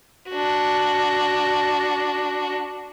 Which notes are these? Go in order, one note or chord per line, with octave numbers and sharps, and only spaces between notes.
D4 F#4